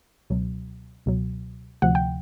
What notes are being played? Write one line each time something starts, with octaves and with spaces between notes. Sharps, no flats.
C#2 B2 F#3
C#2 B2 F#3
D2 C3 F3 F#5
G5